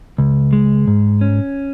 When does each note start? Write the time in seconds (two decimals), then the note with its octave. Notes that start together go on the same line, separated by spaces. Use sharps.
0.18 C#2
0.53 G#3
0.87 G#2
1.21 C#4